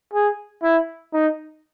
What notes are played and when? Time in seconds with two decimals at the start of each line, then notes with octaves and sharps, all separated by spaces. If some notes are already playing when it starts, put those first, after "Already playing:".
0.13 G#4
0.63 E4
1.13 D#4